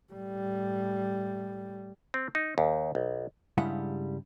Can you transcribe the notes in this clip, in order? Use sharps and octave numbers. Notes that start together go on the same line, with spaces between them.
A2 G3
C4
D#4
D#2
B1
G2 C#3 G3 G#3 E4 F#5